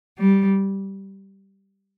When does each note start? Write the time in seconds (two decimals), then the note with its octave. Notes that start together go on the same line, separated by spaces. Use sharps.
0.19 G3